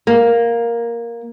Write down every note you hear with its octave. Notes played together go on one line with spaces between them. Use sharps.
A#3